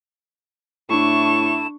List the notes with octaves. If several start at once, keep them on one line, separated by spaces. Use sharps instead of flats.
A2 A3 D4 E4 C#6 E7